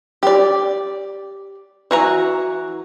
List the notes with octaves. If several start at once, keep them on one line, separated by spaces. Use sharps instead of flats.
G4 D5
E3 F#4 A#5